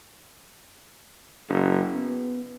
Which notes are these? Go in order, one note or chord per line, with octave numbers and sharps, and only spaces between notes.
F#1
B3